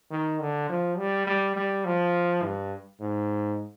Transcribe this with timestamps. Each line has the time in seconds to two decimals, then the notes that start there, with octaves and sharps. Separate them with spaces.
0.11 D#3
0.41 D3
0.69 F3
0.97 G3
1.27 G3
1.56 G3
1.85 F3
2.42 G2
3.00 G#2